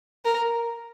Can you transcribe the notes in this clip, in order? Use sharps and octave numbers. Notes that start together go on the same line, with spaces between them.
A#4